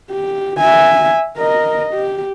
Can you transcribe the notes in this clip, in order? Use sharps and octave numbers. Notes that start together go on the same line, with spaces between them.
G4
E5 G#5
A#4 D#5
G4